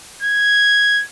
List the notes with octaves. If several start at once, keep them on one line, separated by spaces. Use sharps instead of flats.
G#6